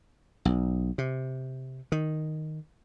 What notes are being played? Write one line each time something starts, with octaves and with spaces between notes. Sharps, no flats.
B1
C3
D#3